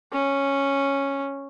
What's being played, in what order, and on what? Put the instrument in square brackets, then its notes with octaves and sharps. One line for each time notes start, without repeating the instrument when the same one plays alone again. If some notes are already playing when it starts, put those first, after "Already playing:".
[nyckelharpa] C#4